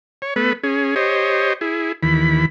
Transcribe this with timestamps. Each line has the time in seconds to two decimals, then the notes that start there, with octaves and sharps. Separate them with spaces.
0.22 C#5
0.36 A3 B3 B4
0.63 C#4 G#4
0.96 G4 C5 C#5 D#5
1.61 E4 G#4
2.03 D#2 E3 B5